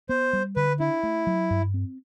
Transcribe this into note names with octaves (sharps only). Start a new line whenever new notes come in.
B3 C5
G3
D3 B4
D4 E4
A3
F#3
G2
C4